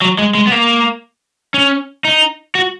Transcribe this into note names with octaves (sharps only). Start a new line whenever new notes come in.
F#3
G#3
G#3
B3
A#3
C#4
D#4
F#4